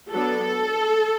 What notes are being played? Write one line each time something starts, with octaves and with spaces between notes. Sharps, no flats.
F#3 B3 D4 A4